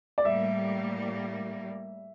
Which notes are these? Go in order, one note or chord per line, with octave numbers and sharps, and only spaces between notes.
D5
A2 G3 A#3 E5